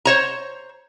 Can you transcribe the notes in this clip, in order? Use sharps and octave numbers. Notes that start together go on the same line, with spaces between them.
C5 C#5 A#5